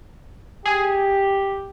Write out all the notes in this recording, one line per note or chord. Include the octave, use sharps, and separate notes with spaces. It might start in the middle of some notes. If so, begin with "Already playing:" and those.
G4 G#4